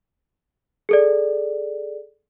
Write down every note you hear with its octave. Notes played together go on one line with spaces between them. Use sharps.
G#4 A4 D5